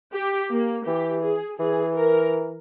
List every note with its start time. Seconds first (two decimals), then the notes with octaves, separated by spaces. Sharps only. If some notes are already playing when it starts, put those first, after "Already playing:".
0.13 G4
0.50 A#3
0.86 E3 G4
1.23 G#4
1.59 E3 G#4
1.96 A#4